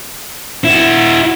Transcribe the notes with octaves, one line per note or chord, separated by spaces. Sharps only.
E4 F#4